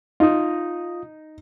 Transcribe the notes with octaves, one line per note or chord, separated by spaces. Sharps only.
D#4 F4 D#6